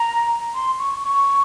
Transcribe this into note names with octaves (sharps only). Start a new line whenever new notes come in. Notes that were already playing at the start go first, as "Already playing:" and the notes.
Already playing: A#5
C6
C#6
C#6